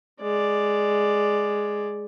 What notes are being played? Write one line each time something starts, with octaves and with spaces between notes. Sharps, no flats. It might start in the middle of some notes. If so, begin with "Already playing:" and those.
G#3 D5